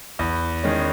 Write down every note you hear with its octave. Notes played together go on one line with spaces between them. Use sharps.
E2
D#3 G#3 C#4